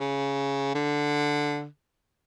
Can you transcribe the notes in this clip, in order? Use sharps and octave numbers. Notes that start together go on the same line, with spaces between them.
C#3
D3